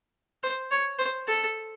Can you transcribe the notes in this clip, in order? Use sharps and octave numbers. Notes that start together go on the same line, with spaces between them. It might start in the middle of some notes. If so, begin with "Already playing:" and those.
C5
C#5
C5
A4